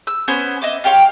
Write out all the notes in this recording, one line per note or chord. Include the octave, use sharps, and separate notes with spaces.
E6
B3 C#4 C5 G#5
D#5 E5 D6
F4 G4 C#5 F5